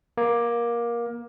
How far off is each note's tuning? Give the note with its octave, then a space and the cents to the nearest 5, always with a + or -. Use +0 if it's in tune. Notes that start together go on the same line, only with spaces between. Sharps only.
A#3 +20